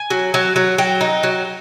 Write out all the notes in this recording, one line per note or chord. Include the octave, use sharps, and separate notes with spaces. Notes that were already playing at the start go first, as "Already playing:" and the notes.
Already playing: G#5
F#3
F#3
F#3
F#3 G5
D#4
F#3